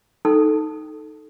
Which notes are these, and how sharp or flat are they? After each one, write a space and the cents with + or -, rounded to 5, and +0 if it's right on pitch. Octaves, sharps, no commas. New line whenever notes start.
D#4 +0 A4 -5